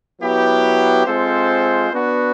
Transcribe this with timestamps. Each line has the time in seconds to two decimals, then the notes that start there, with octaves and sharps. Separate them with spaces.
0.21 F#3 B3 E4 G4
1.06 G#3 C4 F4 A4 C5
1.91 B3 D4 F#4